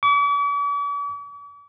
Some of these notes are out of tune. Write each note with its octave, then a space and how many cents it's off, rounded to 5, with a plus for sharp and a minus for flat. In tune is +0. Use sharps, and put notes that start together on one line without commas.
D6 -45